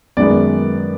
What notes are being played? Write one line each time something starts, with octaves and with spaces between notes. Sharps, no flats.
F#2 D#3 G#3 B3 D5